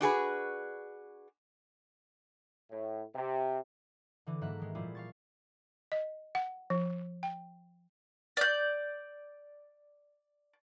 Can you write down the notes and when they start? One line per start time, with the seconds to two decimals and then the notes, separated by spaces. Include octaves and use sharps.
0.01 D4 F#4 G#4 B4
2.71 A2
3.16 C3
4.27 D3 E3 D6
4.41 G#2 F#3 A#3 F#4 E5 F#6
4.60 D#3 G#3
4.75 A#2 F3 G3 E4 F4 G#4
4.95 F5 C#6 A6
5.92 D#5
6.35 F#5
6.70 F3
7.23 G5
8.37 D5 G6